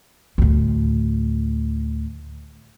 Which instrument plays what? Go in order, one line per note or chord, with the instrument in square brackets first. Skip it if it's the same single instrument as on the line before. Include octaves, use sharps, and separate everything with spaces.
[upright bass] D2 A2